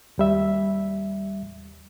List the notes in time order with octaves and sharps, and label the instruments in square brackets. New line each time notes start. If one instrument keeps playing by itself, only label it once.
[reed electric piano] D#2 G3 E5